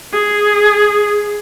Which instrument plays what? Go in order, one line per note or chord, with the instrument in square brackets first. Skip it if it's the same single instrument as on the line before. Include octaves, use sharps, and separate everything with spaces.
[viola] G#4